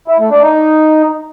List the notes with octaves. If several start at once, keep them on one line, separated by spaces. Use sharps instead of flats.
E4
A3
D4
D#4